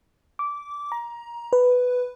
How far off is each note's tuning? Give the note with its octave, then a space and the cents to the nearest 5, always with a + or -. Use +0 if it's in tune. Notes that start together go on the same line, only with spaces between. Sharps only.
D6 -15
A#5 +20
B4 +5